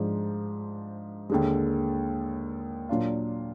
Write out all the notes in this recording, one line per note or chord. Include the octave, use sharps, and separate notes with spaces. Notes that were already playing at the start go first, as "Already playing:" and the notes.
Already playing: G#2 F3 G#3 D4
D#2 D3 G#3
A#2 F#3 D4 F4